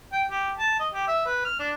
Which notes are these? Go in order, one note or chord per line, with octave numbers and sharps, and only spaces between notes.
G5
G4
A5
D#5
G4
E5
B4
F6
D4